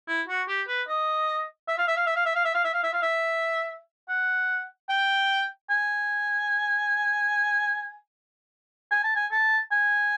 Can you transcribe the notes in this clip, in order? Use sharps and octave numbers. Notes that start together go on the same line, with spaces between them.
E4
F#4
G4
B4
D#5
E5
F5
E5
F5
E5
F5
E5
F5
E5
F5
E5
F5
E5
F5
E5
F#5
G5
G#5
G#5
A5
G#5
A5
G#5